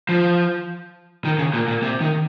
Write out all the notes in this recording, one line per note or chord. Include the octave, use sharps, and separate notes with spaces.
F3
D#3
C#3
A#2
A#2
C3
D#3